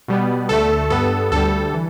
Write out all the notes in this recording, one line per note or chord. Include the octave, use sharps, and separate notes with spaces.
B2 G3 B3
D2 D3 A3 A4
G2 G3 B3 A4
D2 D3 G3 A4
E3